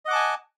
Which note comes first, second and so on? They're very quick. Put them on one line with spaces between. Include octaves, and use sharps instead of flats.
D#5 F#5 D6 A5 G#5